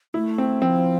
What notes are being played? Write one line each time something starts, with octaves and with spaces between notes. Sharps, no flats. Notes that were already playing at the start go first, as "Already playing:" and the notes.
A3 E4
C4
F3 C4